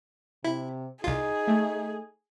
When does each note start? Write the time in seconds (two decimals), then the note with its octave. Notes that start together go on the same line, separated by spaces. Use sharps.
0.44 C3 E4
1.04 C2 D#4 F4 G#4
1.47 A3